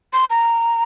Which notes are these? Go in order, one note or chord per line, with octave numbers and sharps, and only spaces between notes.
C6
A#5